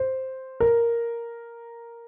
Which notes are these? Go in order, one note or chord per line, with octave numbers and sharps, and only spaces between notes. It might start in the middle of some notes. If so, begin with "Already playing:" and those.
Already playing: C5
A#4